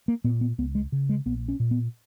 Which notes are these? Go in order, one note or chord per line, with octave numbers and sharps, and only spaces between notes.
A#3
A#2 B3
B3
C#2 B3
G#3
C#3
G#3
A#1 B3
C#4
A#2
B3